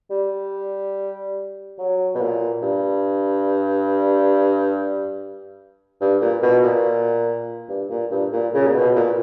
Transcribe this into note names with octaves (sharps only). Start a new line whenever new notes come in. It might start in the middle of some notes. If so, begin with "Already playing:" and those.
G3
F#3
B2
A#2
G2
G2
A#2
B2
A#2
G2
A#2
G2
A#2
C#3
A#2
B2
A#2